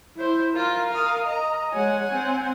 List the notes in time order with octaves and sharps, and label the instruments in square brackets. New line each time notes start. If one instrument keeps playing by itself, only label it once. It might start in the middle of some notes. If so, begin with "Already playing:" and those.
[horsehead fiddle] E4 C5
[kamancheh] F4 [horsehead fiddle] A#4
[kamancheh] F5 D#6
D#5 A#5
[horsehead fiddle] G#3 C#5 [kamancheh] F#5 G#5
[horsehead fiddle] C4